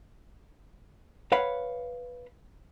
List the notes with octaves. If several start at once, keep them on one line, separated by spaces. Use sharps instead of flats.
B4 C#5 F5 F#5 B5